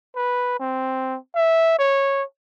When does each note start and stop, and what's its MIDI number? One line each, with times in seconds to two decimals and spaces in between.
0.16 0.55 71
0.60 1.17 60
1.35 1.77 76
1.79 2.23 73